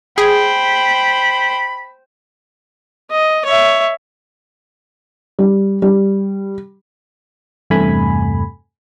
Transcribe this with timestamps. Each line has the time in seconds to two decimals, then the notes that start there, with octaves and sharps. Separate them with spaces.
0.18 G#4 C5 G5 B5
3.11 D#5
3.45 C#5 E5
5.39 G3
5.82 G3
7.70 E2 G2 C3 A3 G#5 B5